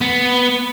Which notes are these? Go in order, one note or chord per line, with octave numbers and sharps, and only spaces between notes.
B3